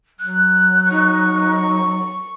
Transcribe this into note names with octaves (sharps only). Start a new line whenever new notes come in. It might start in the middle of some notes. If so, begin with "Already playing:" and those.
F#3 F#6
D#4 C#6